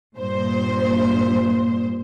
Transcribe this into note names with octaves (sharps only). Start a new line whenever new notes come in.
G2 A#2 C5